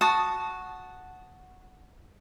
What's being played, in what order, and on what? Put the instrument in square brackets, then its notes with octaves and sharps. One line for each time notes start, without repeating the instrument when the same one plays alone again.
[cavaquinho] F#4 A5 D#6